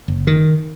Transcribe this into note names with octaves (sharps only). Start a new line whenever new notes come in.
F#1
D#3